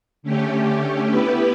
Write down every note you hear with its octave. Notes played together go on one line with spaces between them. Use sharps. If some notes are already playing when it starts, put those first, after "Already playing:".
D3 A3 C#4 G4
B3 E4 G4 B4